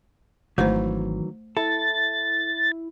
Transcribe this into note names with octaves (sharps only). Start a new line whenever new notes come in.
G#1 D#3 E3 F#3 A3 C5
E4 A4 A6